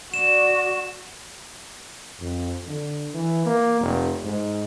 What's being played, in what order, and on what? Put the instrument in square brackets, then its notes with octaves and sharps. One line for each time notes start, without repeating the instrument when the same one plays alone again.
[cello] F#4 [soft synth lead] D5 [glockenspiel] E7
[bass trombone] F2
D3
E3
A#3
F1
G#2